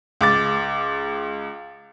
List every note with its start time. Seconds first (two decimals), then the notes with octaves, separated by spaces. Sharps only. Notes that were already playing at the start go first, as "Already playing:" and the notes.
0.21 C#2 D6 A6